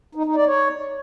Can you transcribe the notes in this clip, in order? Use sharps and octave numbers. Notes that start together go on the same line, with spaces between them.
D#4
D#4
D5
C#5